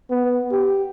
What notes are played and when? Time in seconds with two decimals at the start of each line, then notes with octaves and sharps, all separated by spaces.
0.10 B3
0.52 G4